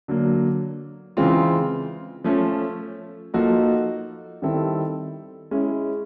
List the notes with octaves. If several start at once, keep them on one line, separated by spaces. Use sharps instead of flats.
D3 F#3 A#3
C#3 E3 G#3 C4 F4
F3 A3 C#4
F3 A#3 D#4 F#4 A4
D#3 G3 C4 E4 A4
G#3 C#4 E4